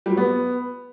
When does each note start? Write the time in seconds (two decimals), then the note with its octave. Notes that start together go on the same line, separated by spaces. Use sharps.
0.06 G3
0.12 F#3
0.17 B3